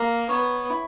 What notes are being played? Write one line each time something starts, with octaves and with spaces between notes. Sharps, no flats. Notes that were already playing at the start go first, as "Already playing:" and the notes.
Already playing: A#3 A#4
B3 C#5
E4